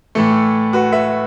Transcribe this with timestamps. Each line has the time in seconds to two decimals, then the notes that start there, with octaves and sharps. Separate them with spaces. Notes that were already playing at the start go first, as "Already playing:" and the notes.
0.15 A2 E3 A3 A4
0.73 F#4 B4
0.92 B4 E5